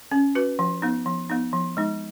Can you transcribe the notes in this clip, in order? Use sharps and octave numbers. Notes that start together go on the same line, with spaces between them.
C#4
F#4 B4
F3
B3 D#4
F3
B3 D#4
F3
G#3 D#4